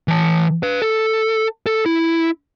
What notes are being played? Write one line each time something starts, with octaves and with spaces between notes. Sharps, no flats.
E3 A5
B4 F5
A4
A4
E4